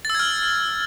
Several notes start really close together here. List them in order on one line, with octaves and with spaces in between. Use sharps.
A6 E6 G#6 F6